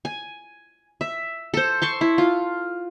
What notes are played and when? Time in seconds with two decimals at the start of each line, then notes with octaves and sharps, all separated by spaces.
0.05 G#5
1.01 E5
1.54 A4 C5
1.82 A5 C6 C#6
2.01 E4
2.18 F4